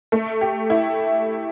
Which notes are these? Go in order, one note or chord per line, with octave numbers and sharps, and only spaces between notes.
A3
G4
E4